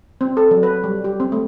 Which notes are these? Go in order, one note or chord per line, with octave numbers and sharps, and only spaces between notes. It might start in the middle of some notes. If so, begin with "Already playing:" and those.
C4
A4
F#3
B4
G3
G4
C4
A3